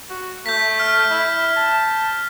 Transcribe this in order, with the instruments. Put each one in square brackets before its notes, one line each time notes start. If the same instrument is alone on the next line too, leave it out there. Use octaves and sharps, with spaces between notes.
[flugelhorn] F#4
[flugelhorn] A3 [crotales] G6 B6
[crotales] F6
[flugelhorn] E4
A5